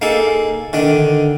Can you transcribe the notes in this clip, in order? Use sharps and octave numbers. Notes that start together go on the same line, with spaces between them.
A#3 D#4 G#4 A4
D3 D#3 D4